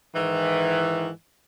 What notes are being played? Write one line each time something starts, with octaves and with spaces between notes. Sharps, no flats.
G#2 D#3 E3